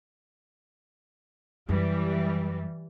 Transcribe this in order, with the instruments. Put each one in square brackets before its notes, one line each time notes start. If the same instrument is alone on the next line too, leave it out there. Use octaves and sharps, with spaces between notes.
[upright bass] F#2 [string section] E3 G3